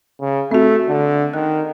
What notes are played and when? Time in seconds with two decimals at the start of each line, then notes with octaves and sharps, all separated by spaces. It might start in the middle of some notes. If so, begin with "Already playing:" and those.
0.21 C#3
0.51 A3 C4 F#4
0.88 D3
1.34 D#3 F#6